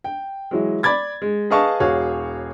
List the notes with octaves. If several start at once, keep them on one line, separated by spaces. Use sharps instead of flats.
G5
E3 F#3 G#3
D5 B5 D6 G#6 A6
G#3
G#4 B4 D#5 F5 A5 C#6
E1 F#4 G#4 C#5 F5